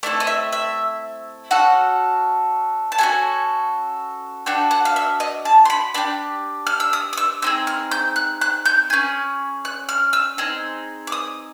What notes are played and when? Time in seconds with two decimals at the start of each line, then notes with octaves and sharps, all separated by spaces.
0.03 A3 C4 E4 A4 D5
0.20 D#5
0.27 E5
0.52 E5
1.51 C#4 F#4 A4 F#5
2.92 A5
2.98 C#4 F#4 A4 G#5
4.46 D4 F#4 A4 G5
4.71 F#5
4.85 F5
4.96 E5
5.20 D#5
5.45 A5
5.65 C6
5.70 B5
5.94 D4 G4 B5
6.67 F6
6.80 E6
6.93 D#6
7.13 D#6
7.17 E6
7.42 C4 D#4 G#4 E6
7.67 F6
7.91 G6
8.16 F#6
8.41 F#6
8.65 G6
8.90 C#4 E4 G#4
9.65 F#6
9.89 F6
10.13 E6
10.38 C4 D#4 G#4
11.07 D6
11.12 D#6